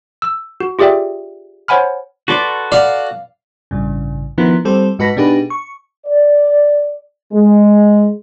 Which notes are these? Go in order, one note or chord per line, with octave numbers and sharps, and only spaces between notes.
E6
F#4
F4 G4 G#4 D5 E5 G5
C5 C#5 F#5 G#5 B5 F6
F#4 A4 B4 D5 C6
D5 F5 F#5
A1 G2 C#3
D#3 F3 B3 E4
G3 C4 A4 C5
G#2 F#4 B4 A5 A#6 B6
B2 D4 D#4 G4 G#4 B4
C#6
D5
G#3